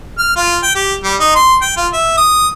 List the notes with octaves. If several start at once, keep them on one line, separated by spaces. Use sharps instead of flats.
F6
F4
G5
G4
G3
D#4
C6
G5
F4
E5
D#6